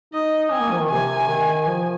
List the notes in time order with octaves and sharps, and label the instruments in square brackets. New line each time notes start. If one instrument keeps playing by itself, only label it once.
[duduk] D#4 [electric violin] D#5
[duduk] C4 [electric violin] G#5
[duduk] A#3
F3
D#3
[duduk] C3 [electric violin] G#5
[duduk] D#3
F3